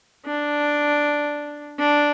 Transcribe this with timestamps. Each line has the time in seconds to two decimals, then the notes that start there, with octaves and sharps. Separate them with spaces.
0.26 D4
1.79 D4